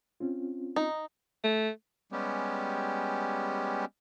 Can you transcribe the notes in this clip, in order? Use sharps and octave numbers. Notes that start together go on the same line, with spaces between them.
C4 C#4 F4
D#4
A3
G3 G#3 B3 C#4 G4